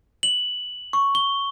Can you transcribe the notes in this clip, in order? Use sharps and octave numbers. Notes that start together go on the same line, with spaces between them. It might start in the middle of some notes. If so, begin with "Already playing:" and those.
F#7
C#6
G7